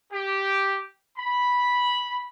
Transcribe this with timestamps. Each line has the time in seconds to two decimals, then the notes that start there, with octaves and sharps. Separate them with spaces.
0.13 G4
1.17 B5